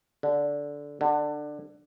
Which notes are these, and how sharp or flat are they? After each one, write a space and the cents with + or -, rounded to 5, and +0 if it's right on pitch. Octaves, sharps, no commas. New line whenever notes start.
D3 -15
D3 +15